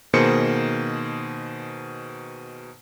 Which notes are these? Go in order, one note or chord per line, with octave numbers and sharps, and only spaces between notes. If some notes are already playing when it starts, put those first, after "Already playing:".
B2 D#3 A#3 G#4 C5 C#7